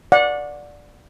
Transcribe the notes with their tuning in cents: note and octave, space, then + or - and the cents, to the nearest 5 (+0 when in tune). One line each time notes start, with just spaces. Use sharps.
D5 +0 F#5 -25